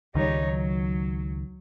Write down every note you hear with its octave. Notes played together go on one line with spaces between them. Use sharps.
C#2 D#3 G3 D#4 C#5
F#3